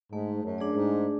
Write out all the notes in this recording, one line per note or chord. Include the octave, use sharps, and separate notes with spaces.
G#2 A3
F#2
D4 G#4 D5
G#2